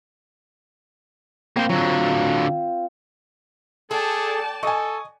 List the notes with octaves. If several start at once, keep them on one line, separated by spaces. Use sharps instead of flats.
A#3 C4 C5 F5
D3 F#3 F4
G#4 A4 D5 G5 A5
A4 D#5 G#5 C#6